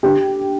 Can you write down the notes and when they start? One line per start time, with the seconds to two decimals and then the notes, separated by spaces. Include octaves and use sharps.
0.03 D3 G4